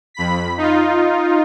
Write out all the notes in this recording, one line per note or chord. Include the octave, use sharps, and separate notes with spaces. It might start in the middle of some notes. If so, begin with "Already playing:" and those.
F2 B5 B6
D#4 F4